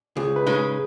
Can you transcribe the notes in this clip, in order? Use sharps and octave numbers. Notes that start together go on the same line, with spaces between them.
C#2 G#4
B4
C#3 G#3 D#4
G#4